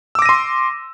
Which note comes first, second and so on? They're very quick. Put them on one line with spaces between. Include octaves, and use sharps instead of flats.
E6 D6 A#6 D#7 C6